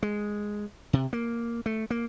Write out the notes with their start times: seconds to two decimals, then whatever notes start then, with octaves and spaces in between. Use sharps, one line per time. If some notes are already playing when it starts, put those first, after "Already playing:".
0.03 G#3
0.93 C3
1.13 A#3
1.66 A3
1.90 A#3